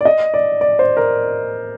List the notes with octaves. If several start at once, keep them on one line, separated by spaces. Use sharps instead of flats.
D5
D#5
D5
D5
C5
A#4